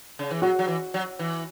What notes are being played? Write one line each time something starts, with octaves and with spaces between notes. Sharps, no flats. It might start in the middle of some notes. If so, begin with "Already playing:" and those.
C#3
E3
F#3 F#4
F#3
E3
F#3
E3